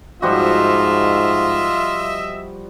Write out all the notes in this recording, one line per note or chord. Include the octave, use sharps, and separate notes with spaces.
G#2 F3 G3 F4 F#4 D#5 E5